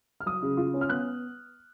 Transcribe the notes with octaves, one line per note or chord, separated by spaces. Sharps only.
F6
F#3 D#6
C#3
F4
C#4
F6
B3 F#6